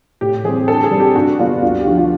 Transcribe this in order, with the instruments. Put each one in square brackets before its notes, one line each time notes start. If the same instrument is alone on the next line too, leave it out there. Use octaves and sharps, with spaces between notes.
[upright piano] A2 [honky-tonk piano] G4
[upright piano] E3 G3 C4 [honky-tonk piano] G#4
[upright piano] D3 [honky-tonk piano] A4
[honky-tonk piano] G#4
[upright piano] G3 C4
[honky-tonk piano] G4
[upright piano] G2 [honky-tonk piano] F#4
[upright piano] D3 G3 B3 D4 [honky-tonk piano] F4
[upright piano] D2 [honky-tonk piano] F4
[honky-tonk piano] G4
[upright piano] D3 F3 [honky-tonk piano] F#4
[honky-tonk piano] F4